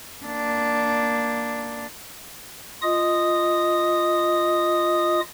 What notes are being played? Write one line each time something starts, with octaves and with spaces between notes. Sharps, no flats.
A#3 D4
F4 D#5 D#6